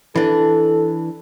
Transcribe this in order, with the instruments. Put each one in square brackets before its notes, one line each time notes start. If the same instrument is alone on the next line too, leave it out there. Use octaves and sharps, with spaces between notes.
[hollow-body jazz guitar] E3 D4 [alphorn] A4